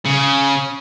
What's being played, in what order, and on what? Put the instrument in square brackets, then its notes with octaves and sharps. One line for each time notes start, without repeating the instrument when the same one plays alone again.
[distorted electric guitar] C#3